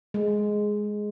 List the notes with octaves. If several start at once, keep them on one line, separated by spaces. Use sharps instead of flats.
G#3